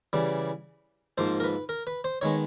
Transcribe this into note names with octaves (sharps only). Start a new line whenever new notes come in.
C#3 E3 G3
G#2 F3 A#3 C5
A#4
B4
A#4
B4
C5
D#3 G#3 B3 C#5